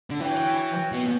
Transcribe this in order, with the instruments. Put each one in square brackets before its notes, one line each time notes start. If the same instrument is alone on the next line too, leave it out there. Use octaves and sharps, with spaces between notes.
[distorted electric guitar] D3
[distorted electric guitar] E3 [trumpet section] F#4 C#5 G5
[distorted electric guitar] B2